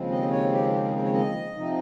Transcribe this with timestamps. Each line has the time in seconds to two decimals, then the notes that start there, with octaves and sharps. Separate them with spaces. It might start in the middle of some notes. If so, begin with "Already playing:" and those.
Already playing: D#2 C#3 F3 G#3 C4
0.10 D#5
0.31 C#5
0.51 G4
0.72 G4
0.83 A#4
0.89 G#4
0.93 A#4
1.04 C#5
1.13 D#5
1.55 C3 F3 C4 D#4